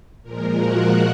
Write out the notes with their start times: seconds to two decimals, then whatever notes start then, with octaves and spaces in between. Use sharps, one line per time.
0.23 A#2 F3 G#3 A#4
0.57 F#4 F#5